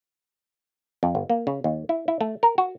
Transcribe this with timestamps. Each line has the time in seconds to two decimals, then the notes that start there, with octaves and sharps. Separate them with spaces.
1.03 F2
1.15 G1
1.30 A#3
1.47 C#3
1.64 D#2
1.89 E4
2.08 E4
2.21 A3
2.43 A#4
2.58 F#4